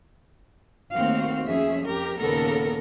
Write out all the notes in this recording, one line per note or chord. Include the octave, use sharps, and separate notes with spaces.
D#2 A3 C4 F#4 F5
F2 F3 C#4 G#4 E5
F2 G4 A#4
D#2 A#2 C#3 B3 A4 A#4